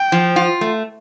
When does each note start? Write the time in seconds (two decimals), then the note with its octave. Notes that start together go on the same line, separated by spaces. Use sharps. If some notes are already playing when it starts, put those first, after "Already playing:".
Already playing: G5
0.12 F3
0.36 F4
0.61 A3